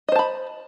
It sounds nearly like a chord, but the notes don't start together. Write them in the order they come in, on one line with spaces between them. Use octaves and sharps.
D#5 C5 A5 B5